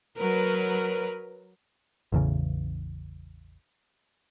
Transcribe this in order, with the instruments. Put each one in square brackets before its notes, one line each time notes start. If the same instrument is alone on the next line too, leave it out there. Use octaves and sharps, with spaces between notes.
[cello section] F#3 A#4 B4
[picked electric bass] A1 E2 C#3